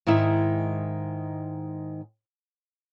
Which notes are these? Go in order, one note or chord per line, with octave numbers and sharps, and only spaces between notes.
G#2 D#3 G#3 E4